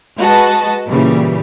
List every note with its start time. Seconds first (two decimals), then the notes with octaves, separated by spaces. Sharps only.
0.18 G#3 F#4 B4 D#5 A5
0.89 A#2 C#3 E3 G3